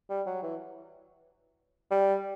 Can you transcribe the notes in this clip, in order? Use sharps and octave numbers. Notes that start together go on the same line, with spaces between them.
G3
F#3
E3
G3